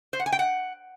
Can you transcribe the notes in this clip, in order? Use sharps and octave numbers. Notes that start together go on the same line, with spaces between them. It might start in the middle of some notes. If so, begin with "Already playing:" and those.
C5
F#5
G#5
G5
F#5